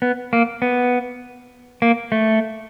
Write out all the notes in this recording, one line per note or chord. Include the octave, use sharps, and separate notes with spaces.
B3
A#3
B3
A#3
A3